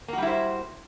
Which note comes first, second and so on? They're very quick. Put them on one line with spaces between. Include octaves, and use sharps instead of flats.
A#3 F#4 G3 E4 C5